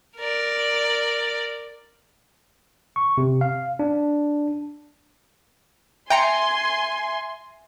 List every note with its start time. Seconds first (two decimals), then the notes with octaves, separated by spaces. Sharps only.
0.17 A#4 D5
2.96 C#6
3.18 C3
3.41 F5
3.79 D4
6.10 E5 G5 G#5 A#5 C6 C#7